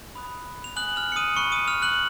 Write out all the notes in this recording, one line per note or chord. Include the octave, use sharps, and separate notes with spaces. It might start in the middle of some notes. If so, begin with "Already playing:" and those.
B5 D#6 F#6
F7
G#5 D#6 F#6 F#7
F6 F7
C#7
D#6 D#7
B5 C#6 D#6 F#6 C#7
D#6 D#7
F6 F7
F#6 F#7